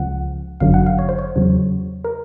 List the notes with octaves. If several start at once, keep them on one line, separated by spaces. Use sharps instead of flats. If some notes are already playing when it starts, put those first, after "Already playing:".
Already playing: C#2 C#3 F3 F#5
G1 F#2 D3 F#3 F5
F#5
F5
C#5
C5
C#5
E2 C#3 F#3
A#4